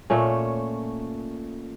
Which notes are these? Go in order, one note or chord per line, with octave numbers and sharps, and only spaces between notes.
A#2 A3 C#4